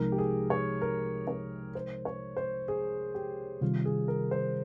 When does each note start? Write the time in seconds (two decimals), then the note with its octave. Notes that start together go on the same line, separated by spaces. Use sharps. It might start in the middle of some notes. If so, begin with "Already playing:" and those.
Already playing: C2 C3 F3 G#3 D#4 A#4
0.12 G4
0.18 G#4
0.50 C#5
0.81 A#4
1.27 C#5
1.75 C5
2.05 C#5
2.37 C5
2.68 G#4
3.15 G4
3.61 C3 D#3 G3 F4
3.85 G#4
4.08 A#4
4.31 C5